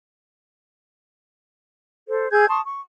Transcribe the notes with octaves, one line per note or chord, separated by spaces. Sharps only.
A4 C5
G#4 E6 G6 G#6
A5 C6 C#6 D#6
C#6